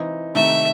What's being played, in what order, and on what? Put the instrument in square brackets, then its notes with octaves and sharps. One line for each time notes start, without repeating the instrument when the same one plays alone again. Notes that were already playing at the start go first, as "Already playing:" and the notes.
Already playing: [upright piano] E3 C4 D#4
[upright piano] C3 D#3 A3 D#4 [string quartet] E5